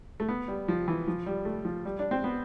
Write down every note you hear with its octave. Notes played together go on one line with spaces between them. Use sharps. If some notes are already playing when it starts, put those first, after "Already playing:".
A3
B3
G3
F3
E3
F3
G3
A3
F3
G3
D4
C4
B3